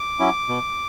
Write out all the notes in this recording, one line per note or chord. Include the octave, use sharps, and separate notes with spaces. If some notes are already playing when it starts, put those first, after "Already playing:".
Already playing: D6
F#3 C#4 E4
B2